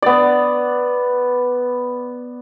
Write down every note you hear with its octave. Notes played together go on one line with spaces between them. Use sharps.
B3 D5